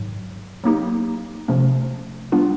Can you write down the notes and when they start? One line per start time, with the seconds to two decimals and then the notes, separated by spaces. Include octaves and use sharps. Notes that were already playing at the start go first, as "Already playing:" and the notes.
Already playing: G#2 D#3 F#3
0.64 F#3 A#3 D#4 G4
1.48 C3 F3 A3 C#4
2.32 G3 B3 D4 F4